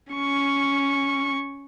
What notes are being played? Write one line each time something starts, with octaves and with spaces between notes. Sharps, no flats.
C#4 C#6